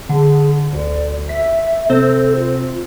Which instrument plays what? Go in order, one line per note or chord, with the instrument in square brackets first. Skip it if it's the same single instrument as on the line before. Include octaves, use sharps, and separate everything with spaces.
[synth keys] D3 [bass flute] G#4
[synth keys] D2 [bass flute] D5
[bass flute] E5 [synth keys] B6
[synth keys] C3 C4 C5 [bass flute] A4
[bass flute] F4